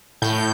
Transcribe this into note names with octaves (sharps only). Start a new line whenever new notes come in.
A2 G6